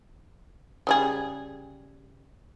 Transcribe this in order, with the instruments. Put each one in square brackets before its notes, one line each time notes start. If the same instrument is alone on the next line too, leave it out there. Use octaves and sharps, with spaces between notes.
[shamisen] C#3 G3 G#4